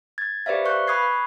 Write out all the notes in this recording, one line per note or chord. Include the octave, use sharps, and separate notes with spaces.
G#6 A6
G4 B4 C5 D5 E5 F5
B4 F5 C#6 F#6 G6
B5 C#6 D#6 F#6 G#6 C7